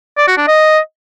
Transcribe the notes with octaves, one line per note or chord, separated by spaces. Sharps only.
D5
F#4
D4
D#5